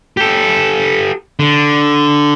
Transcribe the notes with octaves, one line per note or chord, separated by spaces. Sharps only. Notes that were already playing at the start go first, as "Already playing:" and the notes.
G4 A4
D3